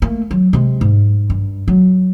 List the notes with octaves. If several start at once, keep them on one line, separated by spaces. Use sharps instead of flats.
A3 A#3
F#3
C3 G#3
G#2
G2
F#3